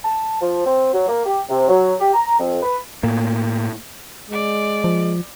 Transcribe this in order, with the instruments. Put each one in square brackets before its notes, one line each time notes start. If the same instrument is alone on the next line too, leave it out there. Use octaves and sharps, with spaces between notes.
[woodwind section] A5
F3
C4
F#3
A#3
G4
C3
F#3
G4
A#5
F2
B4
[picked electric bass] A2 A#3
[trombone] G#3 [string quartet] D5
[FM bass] F3